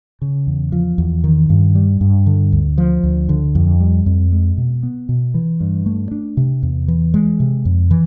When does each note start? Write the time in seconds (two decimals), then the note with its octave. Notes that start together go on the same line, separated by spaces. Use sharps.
0.22 C#3
0.47 E2
0.72 F3
0.98 E2
1.24 D#3
1.50 G2
1.75 G3
2.01 G2
2.27 D3
2.52 D2
2.78 F3
3.03 D2
3.29 D3
3.55 F2
3.80 G3
4.06 F2
4.32 G#3
4.57 B2
4.83 B3
5.09 B2
5.34 E3
5.60 G2
5.86 A3
6.11 D4
6.37 C3
6.63 E2
6.88 E3
7.14 G#3
7.40 C3
7.65 F2
7.91 E3